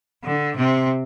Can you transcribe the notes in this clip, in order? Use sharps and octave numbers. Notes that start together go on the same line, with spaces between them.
D3
C3 C4